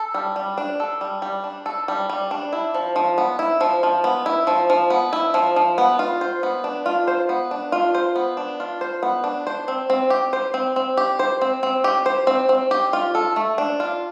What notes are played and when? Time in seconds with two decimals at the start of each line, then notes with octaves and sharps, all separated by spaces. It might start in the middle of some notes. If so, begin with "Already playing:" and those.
Already playing: A4
0.14 G3
0.36 G3
0.58 D4
0.80 A4
1.01 G3
1.22 G3
1.44 D4
1.66 A4
1.88 G3
2.10 G3
2.31 D4
2.53 E4
2.74 F3
2.96 F3
3.18 B3
3.39 E4
3.61 F3
3.83 F3
4.04 B3
4.26 E4
4.47 F3
4.70 F3
4.90 B3
5.13 E4
5.34 F3
5.56 F3
5.78 B3
5.99 F4
6.21 C5
6.43 B3
6.64 D4
6.86 F4
7.08 C5
7.29 B3
7.51 D4
7.72 F4
7.95 C5
8.16 B3
8.37 D4
8.60 F4
8.81 C5
9.03 B3
9.24 D4
9.47 C5
9.68 C4
9.90 C4
10.10 G4
10.33 C5
10.54 C4
10.76 C4
10.97 G4
11.19 C5
11.42 C4
11.63 C4
11.84 G4
12.06 C5
12.27 C4
12.49 C4
12.71 G4
12.93 F4
13.15 A4
13.36 A3
13.58 D4
13.80 F4